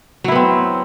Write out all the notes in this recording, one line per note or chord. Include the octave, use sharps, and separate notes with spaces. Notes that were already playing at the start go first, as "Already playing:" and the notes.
F#3 B3 C4 E4